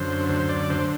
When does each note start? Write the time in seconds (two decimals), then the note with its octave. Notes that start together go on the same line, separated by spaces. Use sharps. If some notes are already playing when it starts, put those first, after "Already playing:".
Already playing: F#2 D3 C5
0.29 D2 C5
0.49 D5
0.70 D3 C5